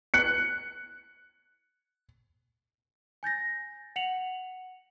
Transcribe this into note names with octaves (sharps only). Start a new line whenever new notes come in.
F#6 C#7
G#5 G6 A6 A#6
F#5 C#7 F7 F#7